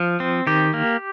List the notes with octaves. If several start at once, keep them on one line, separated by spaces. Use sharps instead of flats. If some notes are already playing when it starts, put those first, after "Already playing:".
Already playing: F3
C4
D#3 G4
A#3